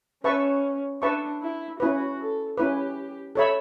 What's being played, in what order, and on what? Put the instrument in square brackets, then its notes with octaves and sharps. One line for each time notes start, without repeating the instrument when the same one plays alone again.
[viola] C#4 [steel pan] B4 E5 A5 C#6
[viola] D4 [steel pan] B4 E5 A5 C#6
[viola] E4
[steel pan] C#4 E4 B4 [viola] F#4
[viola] A4
[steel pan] C#4 E4 B4 [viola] G4
[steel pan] A4 C#5 E5 B5